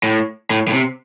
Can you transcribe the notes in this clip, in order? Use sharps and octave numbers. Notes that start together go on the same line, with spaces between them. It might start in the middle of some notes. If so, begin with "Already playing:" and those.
A2
A2
A2
C3